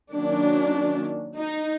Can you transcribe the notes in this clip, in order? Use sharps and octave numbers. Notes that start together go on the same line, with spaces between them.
D#3 F#3 A#3 C#4 D4
D#4